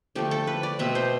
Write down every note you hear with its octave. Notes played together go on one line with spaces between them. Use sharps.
D3 F3 A3 G4
A4
B4
D5
B2 A3 C4 E5
C5